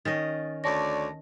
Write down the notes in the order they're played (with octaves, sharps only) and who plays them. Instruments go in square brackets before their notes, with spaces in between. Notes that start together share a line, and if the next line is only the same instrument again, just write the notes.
[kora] D#3 C#4 D#5 [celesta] A6
[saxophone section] D2 C#5 D5 [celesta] A5 A#6